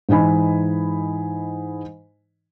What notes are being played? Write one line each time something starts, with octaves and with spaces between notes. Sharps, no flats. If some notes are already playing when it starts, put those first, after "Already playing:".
G#2 E3 D#4 G#5 B5